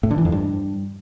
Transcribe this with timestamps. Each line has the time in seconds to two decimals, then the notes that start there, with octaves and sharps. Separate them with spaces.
0.03 A2
0.11 D3
0.18 E3
0.25 F2
0.32 G2